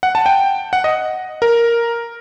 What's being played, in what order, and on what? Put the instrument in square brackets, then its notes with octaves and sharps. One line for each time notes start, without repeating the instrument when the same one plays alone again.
[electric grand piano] F#5
A5
G5
F#5
D#5
A#4